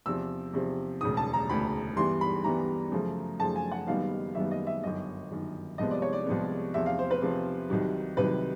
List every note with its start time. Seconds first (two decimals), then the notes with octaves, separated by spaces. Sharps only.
0.06 E2 C3 F3 E6
0.53 E2 C3 F3
1.01 E1 D2 C#3 D#6
1.17 A5
1.33 A#5
1.49 E1 D2 C#3 B5
1.96 G2 E3 G3 B3 C6
2.21 B5
2.44 G2 E3 G3 B3 A#5
2.92 F#2 C#3 F3 A3
3.39 F#2 C#3 F3 A3 A5
3.56 G#5
3.71 F#5
3.87 F#1 F#2 D#3 G3 B3 F5
4.35 F#1 F#2 D#3 G3 B3 E5
4.51 D#5
4.67 E5
4.83 G1 F#2 D#3 D#5
5.31 G1 F#2 D#3
5.78 C2 C3 F3 G#3 B3 D#5
5.91 D5
6.02 C#5
6.13 D5
6.26 C2 C3 F3 G#3 B3
6.74 E2 C3 F3 E5
6.86 F5
6.99 C5
7.11 B4
7.21 E2 C3 F3
7.70 C2 C3 D#3 F#3
8.17 C2 C3 D#3 F#3 B4